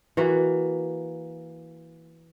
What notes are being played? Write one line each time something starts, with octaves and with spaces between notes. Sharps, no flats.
E3 A#3 F#4